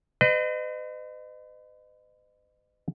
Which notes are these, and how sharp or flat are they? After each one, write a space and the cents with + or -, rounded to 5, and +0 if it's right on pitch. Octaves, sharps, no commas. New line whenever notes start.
B4 +45 D#5 -30